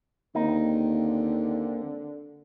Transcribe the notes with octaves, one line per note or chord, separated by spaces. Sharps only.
D#2 D3 A#3 C4 D#4